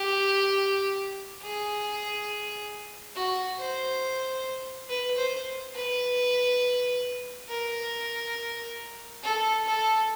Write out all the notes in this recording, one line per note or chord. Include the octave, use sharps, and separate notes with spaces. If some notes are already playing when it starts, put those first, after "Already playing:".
Already playing: G4
G#4
F#4
C5
B4
C5
B4
A#4
A4
A4